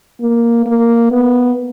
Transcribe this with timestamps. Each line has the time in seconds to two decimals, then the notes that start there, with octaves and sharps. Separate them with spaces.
0.21 A#3
0.66 A#3
1.12 B3